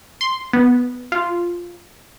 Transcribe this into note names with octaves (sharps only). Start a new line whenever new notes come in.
C6
B3
F4